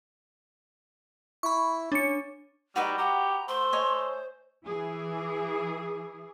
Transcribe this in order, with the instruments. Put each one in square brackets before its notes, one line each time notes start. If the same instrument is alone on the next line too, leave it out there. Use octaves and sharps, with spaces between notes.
[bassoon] E4 [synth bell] B5 C#6
[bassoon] C#4 [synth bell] D4 C#7
[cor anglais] G3 [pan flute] D#4 [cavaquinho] F#4 B4 D#5
[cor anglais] G4 [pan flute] F#5 [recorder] A#5
[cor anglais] A3 [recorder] C5 [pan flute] C6
[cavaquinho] C#5 D#5 G#5
[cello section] E3 G#4